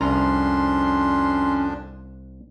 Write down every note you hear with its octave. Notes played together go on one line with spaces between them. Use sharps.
C2 F2 C#4 D4 A#5 C6